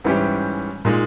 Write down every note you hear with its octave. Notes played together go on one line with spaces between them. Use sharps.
G#2 E3 G3 C#4 G4
A#2 G#3 D#4